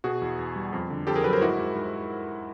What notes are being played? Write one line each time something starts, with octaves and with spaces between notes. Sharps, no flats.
B2 F#4 G#4
E2
E2
G3
F2
D3
F2 G4 A4
G#4 A#4
F#3 A4 B4
A#4 C5
G#2 E4 F#4
G#2
G#2